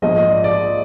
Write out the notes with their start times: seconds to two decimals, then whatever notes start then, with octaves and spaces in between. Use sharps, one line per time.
0.02 A#1 G#2 F3 D#5
0.17 D#5
0.31 D5
0.44 D5